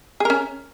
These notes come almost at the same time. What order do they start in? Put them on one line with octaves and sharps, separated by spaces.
G#4 A#4 C#4